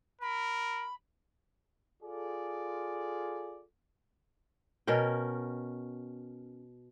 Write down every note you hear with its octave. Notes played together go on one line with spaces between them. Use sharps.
A#4 B5
F4 G#4 A4 D5
B2 C#4 A#4 G5